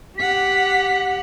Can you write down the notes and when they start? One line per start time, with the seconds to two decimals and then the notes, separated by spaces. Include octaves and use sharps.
0.18 G4 F#5 B6